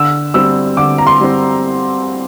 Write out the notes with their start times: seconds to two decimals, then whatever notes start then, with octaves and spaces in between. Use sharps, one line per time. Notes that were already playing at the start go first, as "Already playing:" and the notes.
Already playing: D3 E6
0.34 G3 C4 E6
0.77 D3 D6
0.98 A#5
1.07 C6
1.21 G3 C4